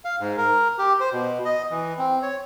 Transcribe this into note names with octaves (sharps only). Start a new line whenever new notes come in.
F5
G#2
A#4
G4
C5
B2
D#5
E3
C4
C#5